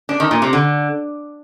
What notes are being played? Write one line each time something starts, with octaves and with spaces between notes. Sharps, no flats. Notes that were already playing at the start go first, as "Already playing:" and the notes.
D4
D#3
A#2
C3
D3